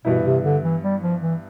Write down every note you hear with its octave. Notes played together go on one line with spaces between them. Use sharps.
G2 B2 E3 B3 E4
C3
D3
E3
G3
F3
E3